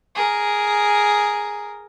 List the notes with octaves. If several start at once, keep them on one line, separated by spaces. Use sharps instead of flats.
G#4 A#4